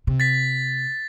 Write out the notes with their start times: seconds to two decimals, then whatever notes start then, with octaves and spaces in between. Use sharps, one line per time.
0.07 C3
0.20 A6 B6